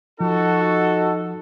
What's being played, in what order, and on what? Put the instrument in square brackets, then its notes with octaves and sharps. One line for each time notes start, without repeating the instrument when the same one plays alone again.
[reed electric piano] F3 [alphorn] D#4 [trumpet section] F#4 A4